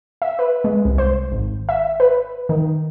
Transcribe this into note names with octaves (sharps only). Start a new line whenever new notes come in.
E5
B4
G#3
C2
C5
G#1
E5
B4
D#3